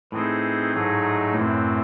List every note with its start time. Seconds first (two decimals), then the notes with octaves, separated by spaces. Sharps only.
0.12 A2 E3 C4 D#4 G#4 C5
0.73 G#2 F#3 A3 D#4 G#4
1.34 F#2 A2 E3 C4